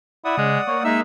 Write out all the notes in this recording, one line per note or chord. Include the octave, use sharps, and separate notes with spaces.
E4 D5 F#5 D#6
C#3 G#3
A#3 C#5
G#3 D#4 E5 E6